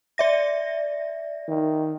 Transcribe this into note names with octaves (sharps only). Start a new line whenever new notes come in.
D5 E5 A#6
D#3